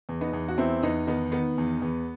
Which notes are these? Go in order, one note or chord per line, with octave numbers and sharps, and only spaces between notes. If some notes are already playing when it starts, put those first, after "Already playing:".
E2
B3 D#4
E2
F#4
E2 C4 E4
E2 B3 D#4
D#3 B3 D#4
D#3 B3
E2
E2